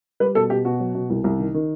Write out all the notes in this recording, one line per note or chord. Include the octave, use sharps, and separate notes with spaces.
G3 B4
B2 A4
B2 G4
B2 F#4
F#3
B2
C2
C2
D#3
D#3